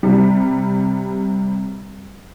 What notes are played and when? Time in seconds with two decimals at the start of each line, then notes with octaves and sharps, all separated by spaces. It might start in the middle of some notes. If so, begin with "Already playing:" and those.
0.03 C3 G3